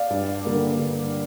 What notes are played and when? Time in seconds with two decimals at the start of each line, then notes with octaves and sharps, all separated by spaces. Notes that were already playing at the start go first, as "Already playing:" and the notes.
Already playing: D5 F5
0.10 G2
0.45 D3 G3 A#3
0.79 G2